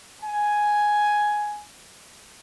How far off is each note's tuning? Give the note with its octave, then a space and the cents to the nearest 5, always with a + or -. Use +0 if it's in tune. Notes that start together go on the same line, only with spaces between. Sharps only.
G#5 +5